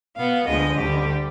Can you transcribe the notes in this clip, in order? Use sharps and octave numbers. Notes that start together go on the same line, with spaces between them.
B2 B3 F5
D2 D3 F3 G#3 D#5
D2 D3 G3 G4